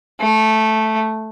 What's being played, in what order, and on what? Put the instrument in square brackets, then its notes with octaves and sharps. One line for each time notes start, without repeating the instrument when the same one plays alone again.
[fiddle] A3